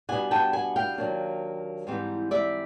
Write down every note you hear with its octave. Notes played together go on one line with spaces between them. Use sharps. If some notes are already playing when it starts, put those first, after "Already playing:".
B2 G3 B3 D4 F#5 G#5
G5 A5
F#5 G#5
F5 G5
D#2 D#3 F#3 A#3 D4
G#2 E3 G3 C4 D#4
D5 E5